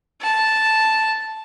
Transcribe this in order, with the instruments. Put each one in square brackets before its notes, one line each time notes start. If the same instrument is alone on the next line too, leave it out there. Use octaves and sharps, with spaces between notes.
[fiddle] A5